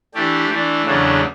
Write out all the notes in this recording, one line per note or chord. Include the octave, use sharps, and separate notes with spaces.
E3 A3 D4 G4
E3 A3 D4
E2 C#3 F#3 A3 D4